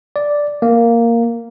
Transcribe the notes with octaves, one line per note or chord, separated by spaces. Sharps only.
D5
A#3